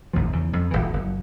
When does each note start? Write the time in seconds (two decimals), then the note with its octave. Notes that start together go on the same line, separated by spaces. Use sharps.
0.13 G1 D#2 A2 F3
0.33 E2 C#3
0.53 F2
0.71 D#1 A#1 A#2 E3
0.93 F#1